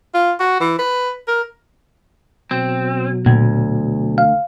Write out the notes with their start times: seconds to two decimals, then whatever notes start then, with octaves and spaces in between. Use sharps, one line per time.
0.14 F4
0.40 F#4
0.60 E3
0.79 B4
1.28 A#4
2.51 B2 F#3 C4
3.26 D2 A#2
4.18 F5